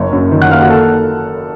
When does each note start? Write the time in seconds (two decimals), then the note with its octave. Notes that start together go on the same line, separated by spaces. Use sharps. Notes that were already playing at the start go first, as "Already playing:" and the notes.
Already playing: F#1 A#3 C#5
0.13 F#2
0.31 D#3
0.42 F#5 F#6
0.51 A#3 F5 F6
0.61 F#4 F#5
0.70 A4 A5